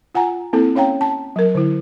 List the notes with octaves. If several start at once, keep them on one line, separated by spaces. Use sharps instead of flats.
F4 F#5 G#5 A#5
A#3 C4 E4 A4
C#4 C#5 F5 G5 A#5
A5
F#3 A#4
D3 E4